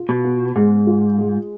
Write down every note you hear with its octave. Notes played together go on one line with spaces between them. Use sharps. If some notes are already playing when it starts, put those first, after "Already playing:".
Already playing: F4
B2
B3
G#2 G#3
F4
G#3